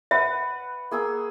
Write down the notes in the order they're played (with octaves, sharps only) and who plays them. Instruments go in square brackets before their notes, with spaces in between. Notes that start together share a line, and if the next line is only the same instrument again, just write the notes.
[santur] B4 F#5 [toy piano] E5
[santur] A#3 G#4 E6